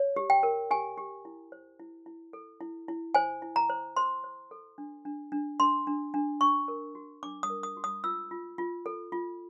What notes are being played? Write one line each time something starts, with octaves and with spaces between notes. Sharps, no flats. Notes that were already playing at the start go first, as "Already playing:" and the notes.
Already playing: C#5
G4
G5
A#4
G4 G#5
G4
E4
C5
E4
E4
A4
E4
E4
C5 G#5
E4
A#5
C5
C5 C6
C5
A4
D4
D4
D4
D4 C6
D4
D4
D4 C#6
A#4
F#4
D4 D6
D#6
A#4
D#6
F#4
D#6
F4 E6
F4
F4
A4
F4